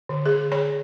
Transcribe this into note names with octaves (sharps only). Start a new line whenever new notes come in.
D3
G#4
C#5